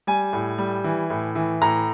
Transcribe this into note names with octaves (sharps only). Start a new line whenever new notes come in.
G3 G#5
A2
G3
E3
A2
E3
A2 A#5